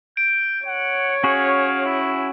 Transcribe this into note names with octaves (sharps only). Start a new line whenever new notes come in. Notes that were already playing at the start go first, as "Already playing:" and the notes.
G6 D7
C#5 F#5
C#4 F#4 G#4 F5
E4